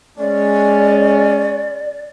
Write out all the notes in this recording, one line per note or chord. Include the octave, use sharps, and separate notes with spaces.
G#3 C#4 D5